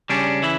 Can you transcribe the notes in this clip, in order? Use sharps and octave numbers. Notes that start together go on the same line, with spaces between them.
C#3 G3 C#4 D4
E3 E4